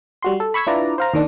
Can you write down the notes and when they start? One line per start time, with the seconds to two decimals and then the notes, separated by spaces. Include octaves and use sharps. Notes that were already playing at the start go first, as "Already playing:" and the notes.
0.22 G3 F#4 C6
0.40 A4
0.54 B5 C#6 E6 G#6 B6
0.67 D4 E4 F4 B4 D5 A#5
0.98 C5 F5 A#5
1.14 D#2 D#3 D4